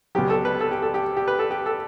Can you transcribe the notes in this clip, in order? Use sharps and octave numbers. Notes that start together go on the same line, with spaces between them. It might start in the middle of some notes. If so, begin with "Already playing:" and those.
C#2 B2 F#3 G4
A4
B4
A4
G4
A4
G4
G4
B4
A4
G4
A4